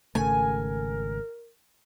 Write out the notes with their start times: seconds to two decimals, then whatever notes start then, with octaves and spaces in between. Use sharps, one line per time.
0.15 G#1 C#3 A3 A#4 G#5